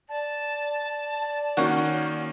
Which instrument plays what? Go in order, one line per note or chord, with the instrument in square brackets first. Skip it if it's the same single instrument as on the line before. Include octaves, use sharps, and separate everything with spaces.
[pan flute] D5 [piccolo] A5
[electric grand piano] D#3 A#3 C#4 [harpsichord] F#4